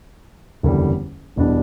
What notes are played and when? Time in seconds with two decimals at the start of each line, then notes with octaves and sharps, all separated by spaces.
0.63 F#1 E2 D3 G3
1.36 E1 E2 B2 G3 D4